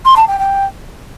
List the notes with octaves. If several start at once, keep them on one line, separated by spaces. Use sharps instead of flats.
C6
A5
G5
G5